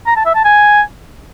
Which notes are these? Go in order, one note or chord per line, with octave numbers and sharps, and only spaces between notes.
A#5
A5
E5
A5
G#5